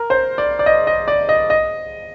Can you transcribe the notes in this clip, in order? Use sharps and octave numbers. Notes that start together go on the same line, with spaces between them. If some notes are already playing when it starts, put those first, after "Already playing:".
Already playing: A#4
C5
D5
D5
D#5
D#5
D5
D#5
D#5